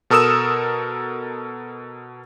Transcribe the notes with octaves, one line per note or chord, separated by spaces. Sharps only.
B2 A4 A#4 D#6 E6 E7